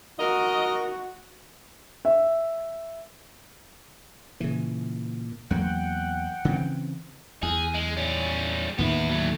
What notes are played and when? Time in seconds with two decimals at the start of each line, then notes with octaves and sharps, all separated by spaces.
0.20 F#4 A#4 D#5
2.05 E5
4.40 A#2 C#3 E3
5.51 E2 F#3 A#3 F#5 G5
6.45 C#3 E3 C4
7.43 E2 G#4
7.74 G#3
7.97 G3 C#4
8.79 D#2 A2 D#3 B3 E4
9.09 F#3 A3